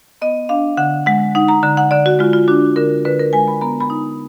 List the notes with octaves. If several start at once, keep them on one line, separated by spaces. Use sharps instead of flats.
B3 D#5
D4 F5
D3 F#5
G#3 F#5
D#4 F#5
A#5
D3 A#5
F#5
D3 D5
F#4
G#3 F4
F4
D4 F#4
D3 A#4
D3 B4
A#4
G#3 G#5
B5
B3 A#5
B5
D#4